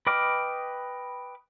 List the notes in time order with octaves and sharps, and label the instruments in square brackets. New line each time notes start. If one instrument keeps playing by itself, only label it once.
[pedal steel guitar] B4 D#5 G5 D6 F6